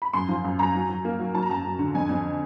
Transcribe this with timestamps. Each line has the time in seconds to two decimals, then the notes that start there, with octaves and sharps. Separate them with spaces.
0.02 B5
0.14 F#2 C6
0.29 F3
0.44 F#2
0.59 F#2 A#5
0.75 F#3
0.89 F#3
1.05 A#3
1.19 F#3
1.34 F#3 A5
1.42 A#5
1.50 F#2 A5
1.64 F#2
1.79 D3
1.94 F2 G#5
2.09 F2